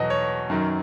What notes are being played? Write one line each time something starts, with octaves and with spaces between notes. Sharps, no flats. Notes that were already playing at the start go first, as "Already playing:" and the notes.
Already playing: E2 B2 F#3 D#5
C#5
F#2 D#3 F#3